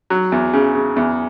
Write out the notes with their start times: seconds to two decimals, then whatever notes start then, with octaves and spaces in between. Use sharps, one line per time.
0.10 F#3
0.32 E2
0.53 C#3
0.75 C#3
0.96 E2